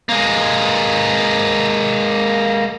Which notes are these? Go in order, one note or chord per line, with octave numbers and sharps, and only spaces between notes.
G#3 A#3